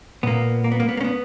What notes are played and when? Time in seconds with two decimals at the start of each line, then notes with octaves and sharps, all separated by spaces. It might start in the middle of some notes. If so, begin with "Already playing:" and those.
0.23 A#2 A#3 B3
0.64 A#3
0.72 B3
0.80 A#3
0.89 B3
0.97 A#3
1.01 C#4
1.04 B3